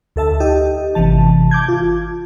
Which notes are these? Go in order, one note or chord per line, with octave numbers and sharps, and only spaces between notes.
D2 A4 E5 A5
D#4 G4 D#5
G#1 C3 E3 A5
A5 D6 G6 G#6
F4